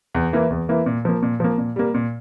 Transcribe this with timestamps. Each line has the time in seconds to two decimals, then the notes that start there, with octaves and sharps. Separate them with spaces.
0.15 E2
0.33 E3 A#3 E4
0.50 E2
0.69 E3 A#3 E4
0.86 A#2
1.05 F3 A#3
1.23 A#2
1.40 F3 A#3
1.58 A#2
1.76 G3 A#3
1.94 A#2